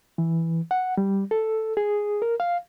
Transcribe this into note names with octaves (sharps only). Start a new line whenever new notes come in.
E3
F#5
G3
A4
G#4
A#4
F5